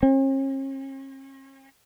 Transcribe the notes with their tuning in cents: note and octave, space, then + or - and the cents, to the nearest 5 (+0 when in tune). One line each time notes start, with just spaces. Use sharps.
C#4 -45